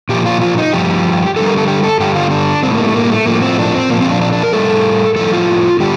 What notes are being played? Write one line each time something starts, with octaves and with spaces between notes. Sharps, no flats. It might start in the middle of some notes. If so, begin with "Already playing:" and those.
A#2 F3 G4
F4
F4
D#4
G2 F3 G4
G2 D3 G3 A4
A#4
A4
G4
A4
G2 D3 G3 G4
F4
D4
A2 G3 C4
A#3
A3
A#3
A3
A2 F3 A#3
C4
D4
C4
A#2 F3 A#3
C4
D4
D4
D4
A#4
A2 G3 A4
A2 F3 A4
F4
D3 G3 G4